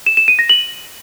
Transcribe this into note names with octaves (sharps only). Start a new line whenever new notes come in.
E7
E7
D#7
A#6
F#7